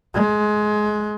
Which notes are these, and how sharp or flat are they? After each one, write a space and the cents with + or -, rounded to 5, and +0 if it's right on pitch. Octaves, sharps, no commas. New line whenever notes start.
G#3 +20